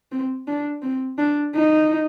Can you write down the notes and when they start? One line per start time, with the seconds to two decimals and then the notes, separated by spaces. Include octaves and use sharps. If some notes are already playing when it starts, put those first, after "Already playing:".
0.12 C4
0.48 D4
0.82 C4
1.18 D4
1.55 D#4